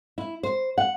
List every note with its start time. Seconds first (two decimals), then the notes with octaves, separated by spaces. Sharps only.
0.18 E4
0.43 C5
0.78 F#5